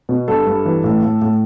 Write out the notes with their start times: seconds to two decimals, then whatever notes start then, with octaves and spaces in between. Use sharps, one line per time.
0.09 B2
0.28 G2 A4
0.46 G2
0.65 E3
0.84 A2
1.02 A2
1.21 A2